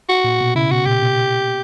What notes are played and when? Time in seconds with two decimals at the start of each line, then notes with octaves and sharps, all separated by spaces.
0.09 F#4
0.24 A#2
0.41 B2
0.55 C#3 E4
0.71 B2 F#4
0.86 A#2 G4
1.02 B2